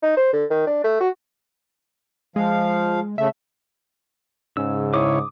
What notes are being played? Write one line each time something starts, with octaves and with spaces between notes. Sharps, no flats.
D#4
C5
D3
D#3
D4
A3
F#4
F3 G#3 F5
C#3 A3 E5
G#2 C#3 E6
E4 C#5 D6 D#6